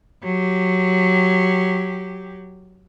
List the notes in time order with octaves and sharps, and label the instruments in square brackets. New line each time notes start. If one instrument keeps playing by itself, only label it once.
[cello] F#3 G4